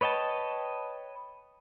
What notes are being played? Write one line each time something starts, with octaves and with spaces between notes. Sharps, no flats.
B4 C#5 D#5 G5 A5